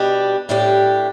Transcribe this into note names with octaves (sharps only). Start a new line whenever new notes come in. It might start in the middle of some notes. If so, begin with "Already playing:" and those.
Already playing: B2 G3 D4 G4
A2 G3 D4 G4